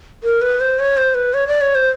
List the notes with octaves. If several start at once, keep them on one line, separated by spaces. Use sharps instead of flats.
A#4
B4
C5
C#5
C5
B4
C#5
D5
C#5
C5